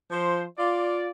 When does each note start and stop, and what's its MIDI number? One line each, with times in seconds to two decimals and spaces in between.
0.11 0.43 53
0.11 0.43 72
0.57 1.07 65
0.57 1.07 74